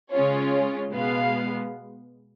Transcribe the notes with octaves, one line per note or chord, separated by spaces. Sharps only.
C#3 G#3 C#4 F4 C#5
C#5
B2 G#3 B3 F5